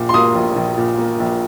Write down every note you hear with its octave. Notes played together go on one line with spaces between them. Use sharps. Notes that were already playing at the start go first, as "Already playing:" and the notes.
Already playing: A#1 A#2
C6
A#3 D#6
A#1
A#1
A#2
A#3
A#1